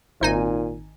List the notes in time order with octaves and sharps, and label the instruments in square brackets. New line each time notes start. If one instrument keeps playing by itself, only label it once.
[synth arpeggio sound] G#1 D#4 G#5 [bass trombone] A#2